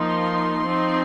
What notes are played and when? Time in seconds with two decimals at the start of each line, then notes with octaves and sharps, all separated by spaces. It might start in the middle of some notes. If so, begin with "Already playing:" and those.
Already playing: F3 A#3 D#4 C6
0.65 F3 C4 D#4